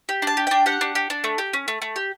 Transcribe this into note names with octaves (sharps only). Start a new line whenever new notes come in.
G4
D4 A5
G4
D4 G5
G4 F#5
D4
G4
D4
A3
G4
C#4
A3
A3
G4